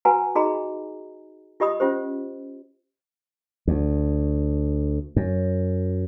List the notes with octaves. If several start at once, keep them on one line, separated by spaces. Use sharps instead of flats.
F#4 B4 F#5 G#5 A#5
D#4 F#4 G#4 D#5 A#5 B5
F4 G4 D#5 B5 D#6
C#4 F4 G4 C5
D2
F#2